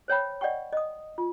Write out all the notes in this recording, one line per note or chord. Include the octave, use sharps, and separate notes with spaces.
C5 C#5 G5 B5
D5 D#5 F#5 G5 C#6
D#5 D#6
F4